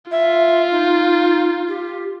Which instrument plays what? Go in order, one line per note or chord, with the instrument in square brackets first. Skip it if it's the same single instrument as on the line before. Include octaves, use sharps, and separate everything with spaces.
[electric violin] F4 [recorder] E5
[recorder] D#4
G4